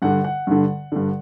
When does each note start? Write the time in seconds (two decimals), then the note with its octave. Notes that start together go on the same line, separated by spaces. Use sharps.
0.02 G2 D3 F#5
0.24 F#5
0.47 G2 D3
0.92 G2 D3